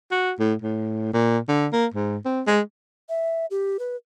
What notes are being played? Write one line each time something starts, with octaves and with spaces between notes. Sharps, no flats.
F#4
A2
A2
A#2
D3
A#3
G#2
C4
G#3
E5
G4
B4